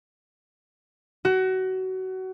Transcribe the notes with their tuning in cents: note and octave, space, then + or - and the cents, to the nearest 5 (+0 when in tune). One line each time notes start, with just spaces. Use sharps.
F#4 +25